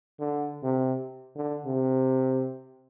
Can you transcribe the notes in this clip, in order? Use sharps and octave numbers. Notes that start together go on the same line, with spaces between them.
D3
C3
D3
C3